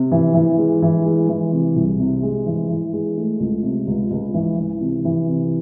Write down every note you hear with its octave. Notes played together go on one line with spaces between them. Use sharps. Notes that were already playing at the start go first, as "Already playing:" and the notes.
Already playing: C3
E3
E3
G#3
E3
G#3
E3
C3
C2
C3
G#3
E3
E3
G#3
A3
C#2
C3
C#2
C#2
E3
E3
C3
E3
C3